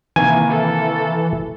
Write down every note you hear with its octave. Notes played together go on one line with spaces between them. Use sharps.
C3 D#3 E3 A#3 G#5
A4